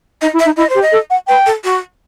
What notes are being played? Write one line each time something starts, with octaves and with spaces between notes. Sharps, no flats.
D#4 D#5
E4
E5
D#4
E4 D#5
C5
G4
D#5
A4
F#5
B4 G5
A4
F#4